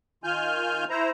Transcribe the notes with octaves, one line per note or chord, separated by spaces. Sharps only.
D#3 F4 G#5 F6 G6
E4 C5 A#5